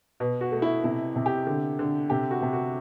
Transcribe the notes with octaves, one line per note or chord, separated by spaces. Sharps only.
B2
F#4
A3
E4
C3 E4
C3
G4
D3
D3
C3 G4
F#4
C3
F#4